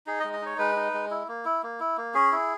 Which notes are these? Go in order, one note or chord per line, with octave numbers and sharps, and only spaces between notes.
D#4 G#4
D#5
G#3
D#5
D#4 C#5
G#3 B4
D#4
G#3
E4
A#3
E4
A#3
E4
A#3
C#4 G#4
E4